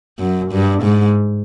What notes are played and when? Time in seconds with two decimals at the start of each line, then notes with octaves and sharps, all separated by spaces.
0.19 F#2
0.51 G2
0.83 G#2